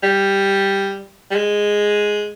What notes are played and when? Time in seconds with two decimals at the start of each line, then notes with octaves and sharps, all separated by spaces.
0.03 G3
1.31 G3
1.36 G#3